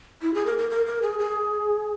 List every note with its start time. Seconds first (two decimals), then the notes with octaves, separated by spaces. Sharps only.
0.22 E4
0.34 G#4
0.46 A#4
0.58 A#4
0.70 A#4
0.86 A#4
1.02 G#4
1.19 G#4